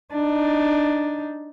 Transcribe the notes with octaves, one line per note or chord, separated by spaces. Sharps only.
D4 D#4